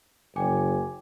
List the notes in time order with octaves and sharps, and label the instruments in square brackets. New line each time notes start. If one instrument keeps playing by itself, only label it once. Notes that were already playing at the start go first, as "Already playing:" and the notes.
[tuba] F#1 [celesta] G5 G#5 D6